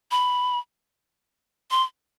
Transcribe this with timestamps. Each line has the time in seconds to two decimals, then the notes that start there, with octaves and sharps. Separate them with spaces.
0.11 B5
1.71 C6